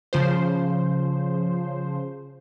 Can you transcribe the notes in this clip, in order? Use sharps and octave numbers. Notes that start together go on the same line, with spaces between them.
C#3 F3 C5